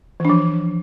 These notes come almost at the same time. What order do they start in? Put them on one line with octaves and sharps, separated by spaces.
E3 D4 F3